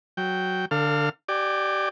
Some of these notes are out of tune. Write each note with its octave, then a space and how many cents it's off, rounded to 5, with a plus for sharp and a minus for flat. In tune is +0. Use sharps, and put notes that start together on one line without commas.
F#3 +0 G5 -5
D3 +0 A4 +40 F5 +0
G4 -25 D5 +15 G#5 -40